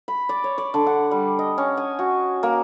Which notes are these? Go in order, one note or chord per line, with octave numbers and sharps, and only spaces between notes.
B5
D5
C#5
D5
D3
F#5
G3
D#5
C#4
G#5
F#4
A#3